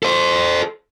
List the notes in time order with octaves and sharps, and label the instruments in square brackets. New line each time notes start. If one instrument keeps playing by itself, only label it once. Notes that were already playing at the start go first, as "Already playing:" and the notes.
[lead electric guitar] A4 C5